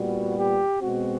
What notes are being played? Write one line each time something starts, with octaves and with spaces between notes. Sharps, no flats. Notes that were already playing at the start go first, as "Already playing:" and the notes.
Already playing: A#2 G3 B3 F#4
G4
B2 G#3 C4 F#4